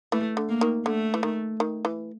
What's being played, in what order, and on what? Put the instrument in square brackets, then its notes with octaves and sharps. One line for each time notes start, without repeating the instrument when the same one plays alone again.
[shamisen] E3 [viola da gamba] A3
[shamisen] D3
[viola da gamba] A#3
[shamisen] D#3
[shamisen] D3 [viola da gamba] A3
[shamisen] E3
D#3
D#3
E3